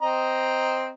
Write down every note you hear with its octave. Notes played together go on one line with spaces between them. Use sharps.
C4 D#5 A#5